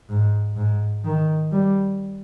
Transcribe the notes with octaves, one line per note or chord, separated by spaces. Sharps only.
G#2
G#2
D#3
G3